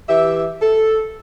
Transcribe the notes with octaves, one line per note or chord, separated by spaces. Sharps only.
E3 G4 E5
A4